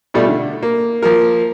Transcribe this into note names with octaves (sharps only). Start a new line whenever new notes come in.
B2 G3 A3 F4
D3
A#3
F3 A#3 A#4